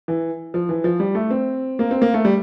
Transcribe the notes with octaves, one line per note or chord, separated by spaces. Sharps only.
E3
F3
E3
F3
G3
A3
C4
A#3
C4
A#3
A3
G3